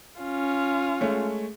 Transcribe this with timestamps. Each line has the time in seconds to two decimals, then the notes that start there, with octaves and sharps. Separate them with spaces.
0.20 C#4 F4
1.01 G#3 A3 C#5